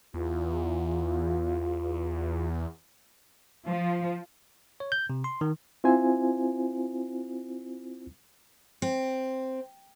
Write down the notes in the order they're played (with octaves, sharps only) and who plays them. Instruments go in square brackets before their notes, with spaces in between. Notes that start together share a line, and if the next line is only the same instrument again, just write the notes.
[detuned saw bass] E2 [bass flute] F4
[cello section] F3
[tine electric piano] C#5
G6
C3
C6
D#3
[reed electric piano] C4 E4 F4 C5 G#5
[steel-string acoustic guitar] C4